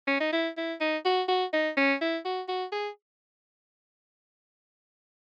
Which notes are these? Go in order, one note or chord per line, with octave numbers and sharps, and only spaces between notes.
C#4
D#4
E4
E4
D#4
F#4
F#4
D#4
C#4
E4
F#4
F#4
G#4